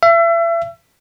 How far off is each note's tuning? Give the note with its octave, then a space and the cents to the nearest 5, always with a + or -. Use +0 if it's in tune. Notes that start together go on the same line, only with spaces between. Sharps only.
E5 +35